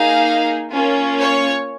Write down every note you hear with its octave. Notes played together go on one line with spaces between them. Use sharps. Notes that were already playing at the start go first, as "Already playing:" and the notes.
Already playing: A#3 D#4 G#4 F5
A#3 C#4 F4
C#5